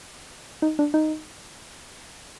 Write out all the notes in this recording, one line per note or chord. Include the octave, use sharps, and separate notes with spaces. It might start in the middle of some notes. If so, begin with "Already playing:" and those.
D#4
D4
D#4